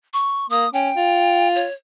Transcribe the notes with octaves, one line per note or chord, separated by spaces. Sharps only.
C#6
A#3 D#6
C#4 G5
F4
C#5